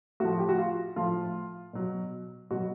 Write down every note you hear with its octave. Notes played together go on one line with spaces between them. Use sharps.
A2 F3 F#4
G4
F#4
F4
A2 F3 F4
B2 F#3
B2 F#3 F#4